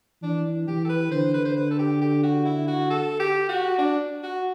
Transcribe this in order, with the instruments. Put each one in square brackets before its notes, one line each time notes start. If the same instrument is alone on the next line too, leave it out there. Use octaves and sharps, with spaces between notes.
[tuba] E3 [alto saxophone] D4
[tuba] E3 [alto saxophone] G4
[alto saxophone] A4
B4
[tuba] D3 [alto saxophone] C5
[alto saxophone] B4
C5
B4
A4
G4
G4
F#4
E4
F#4
A4
G4
F#4
D4
F#4